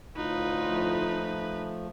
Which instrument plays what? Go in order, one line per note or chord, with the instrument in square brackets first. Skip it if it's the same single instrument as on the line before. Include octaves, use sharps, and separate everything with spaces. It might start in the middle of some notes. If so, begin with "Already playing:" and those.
[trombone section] D2 A2 F4 [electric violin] D#4 B4
[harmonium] F3 A3